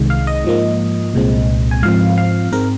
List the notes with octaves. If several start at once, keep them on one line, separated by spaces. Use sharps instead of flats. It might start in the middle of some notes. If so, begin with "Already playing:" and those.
Already playing: C2 C3 D#3 G#3
F5
D#5
G#2 F3 A#3
C2 A#2 G#3 C4
G#5
G#2 F3 C4 F5
F5
G#2 G#3 C4 A#4